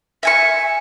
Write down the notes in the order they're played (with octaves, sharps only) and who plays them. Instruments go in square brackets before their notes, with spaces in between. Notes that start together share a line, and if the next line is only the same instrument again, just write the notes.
[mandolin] E5 G#5 C#6